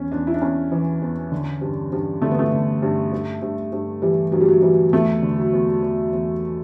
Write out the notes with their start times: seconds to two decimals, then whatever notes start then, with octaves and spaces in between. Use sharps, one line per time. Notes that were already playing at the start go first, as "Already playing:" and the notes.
Already playing: E2 C#4
0.12 E2 D4
0.27 E4
0.34 D4
0.42 E2 C#4
0.72 E3
1.02 E2
1.32 D3
1.61 G2
1.92 G2
2.22 D3 A3
2.31 B3
2.39 A3
2.52 D3
2.82 G2
3.12 G2
3.42 G2
3.73 G2
4.02 E3 G3
4.32 G2 F#3
4.41 G3
4.48 F#3
4.62 E3 G3
4.93 E2 A3
5.22 D3
5.38 F#3
5.53 E2
5.82 E2
6.13 E2